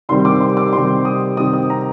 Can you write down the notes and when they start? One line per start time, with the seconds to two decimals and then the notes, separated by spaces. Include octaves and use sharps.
0.09 C3 D#3 G3 C4 C6
0.25 D6
0.40 C6
0.57 D6
0.73 C3 D#3 G3 C4 C6
1.05 D#6
1.37 C3 D#3 G3 C4 D#6
1.53 D#6
1.70 A#5